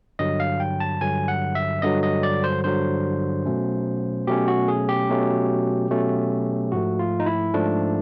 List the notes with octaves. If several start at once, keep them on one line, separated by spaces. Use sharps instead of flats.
G2 D3 F#3 D#5
F5
G5
A5
G2 D3 F#3 G#5
F#5
E5
G2 D3 F#3 D#5
D#5
D5
C5
G2 D3 F#3 C5
B2 F#3 A3 C#4
B2 F#3 A3 C#4 G4
F#4
G#4
G4
B2 F#3 A3 C#4
B2 F#3 A3 C#4
G#2 F3 A3 F#4
F4
D#4
E4
G#2 F3 A3 D4